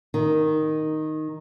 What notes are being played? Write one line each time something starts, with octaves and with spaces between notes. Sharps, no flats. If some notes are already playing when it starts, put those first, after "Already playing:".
D#3